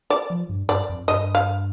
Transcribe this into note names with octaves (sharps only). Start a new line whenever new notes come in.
D5
F3
G2
G2 D5
F2
G2 D#5
F5